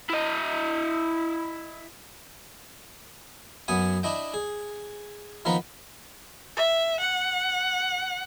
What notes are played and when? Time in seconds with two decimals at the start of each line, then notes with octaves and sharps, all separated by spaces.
0.09 E4 D#5
3.68 F#2 B3 G#5 D#6
4.03 D4 E4 D#5 G5
4.34 G#4
5.45 D#3 F3 B3 D#4 A#4 B4
6.57 E5
7.00 F#5